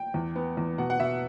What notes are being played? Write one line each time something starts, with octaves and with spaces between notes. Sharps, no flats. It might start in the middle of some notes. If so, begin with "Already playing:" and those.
Already playing: G5
E2
B3
E2
B2 F#5
F#5
B2 E5